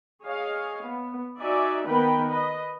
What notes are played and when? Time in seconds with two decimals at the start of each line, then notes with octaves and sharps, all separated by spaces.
0.23 G#4 C#5 D#5 F5
0.84 B3
1.39 D#4 F#4 D5 E5 G#5
1.87 D#3 B3 A#4 B4 G5 B5
2.29 B4 D#5